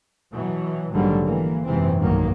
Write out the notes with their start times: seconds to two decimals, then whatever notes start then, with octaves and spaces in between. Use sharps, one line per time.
0.33 B2 E3 F#3
0.92 A#1 G#2 D3 D#3 F#3 G3
1.23 E3 A#3
1.64 F#1 G#2 C3 E3 C4
1.98 F1 B1 G2 D#3 F#3 A#3